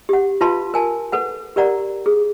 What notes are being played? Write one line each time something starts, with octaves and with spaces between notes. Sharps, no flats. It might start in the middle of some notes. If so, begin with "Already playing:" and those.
G4 F#5
F4 B4 F5 A5 C6
A#4 G#5 A5
A4 B4 F#5
G4 A#4 D5 F#5 A#5
G#4